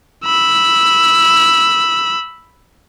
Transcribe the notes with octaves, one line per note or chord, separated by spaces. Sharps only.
B5 E6